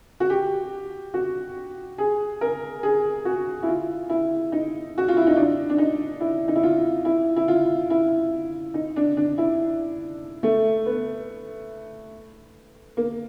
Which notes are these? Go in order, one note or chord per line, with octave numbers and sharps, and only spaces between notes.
F#4
G4
F#4
G#4
A#4
G#4
F#4
E4
F4
E4
D#4
F#4
F4
E4
D#4
D4
D4
D#4
E4
D#4
E4
F4
E4
E4
F4
E4
D#4
D4
D4
E4
A3
B3
A#3